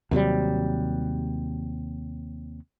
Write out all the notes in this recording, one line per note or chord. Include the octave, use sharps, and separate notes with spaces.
D#2 C3 F#3 G3